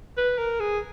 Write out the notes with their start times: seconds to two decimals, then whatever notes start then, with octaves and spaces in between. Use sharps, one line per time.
0.17 B4
0.38 A#4
0.60 G#4